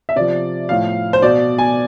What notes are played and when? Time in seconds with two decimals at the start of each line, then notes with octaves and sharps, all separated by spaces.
0.09 E5
0.16 C3 F3 D5
0.69 A2 F3 F5
1.13 C5
1.22 B2 D5
1.58 G#5